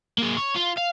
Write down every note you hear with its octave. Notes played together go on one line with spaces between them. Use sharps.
A#3 G#4
C#5
F4
F5